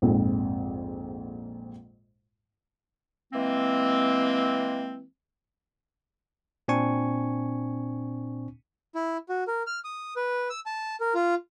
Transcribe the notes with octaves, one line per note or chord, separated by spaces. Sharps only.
A#1 F2 G#2
E3 G#3 A#3 C4
A#2 C4 D4 G#5 C#6
E4
F#4
A#4
F6
D#6
B4
E6
A5
A#4
F4